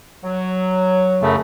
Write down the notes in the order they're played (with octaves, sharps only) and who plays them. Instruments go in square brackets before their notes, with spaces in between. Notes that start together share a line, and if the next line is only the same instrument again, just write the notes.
[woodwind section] F#3
[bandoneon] F#2 C#3 A3